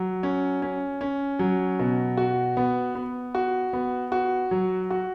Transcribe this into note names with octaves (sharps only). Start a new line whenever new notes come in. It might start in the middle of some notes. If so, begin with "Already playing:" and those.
Already playing: F#3
C#4
C#4
C#4
F#3
B2
F#4
B3
B3
F#4
B3
F#4
F#3
F#4